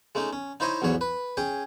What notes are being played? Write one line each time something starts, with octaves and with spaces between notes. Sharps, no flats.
G#3 A3 C#4 D#4
C#4
D#4 E4 C5 C#5 D#5 D#6
B1 E2 G#2 C#5
B4
C#4 G#4 G5 G#5